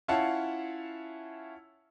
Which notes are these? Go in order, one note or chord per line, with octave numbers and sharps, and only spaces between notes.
C#4 E4 F4 F5 F#5 A5